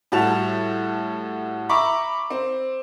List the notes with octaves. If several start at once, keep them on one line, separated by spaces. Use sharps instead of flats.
A2 G3 F#4 A5 F7
E5 A#5 B5 C#6 D6
C4